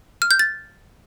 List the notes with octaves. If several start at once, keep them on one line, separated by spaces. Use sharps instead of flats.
F6
G6
A6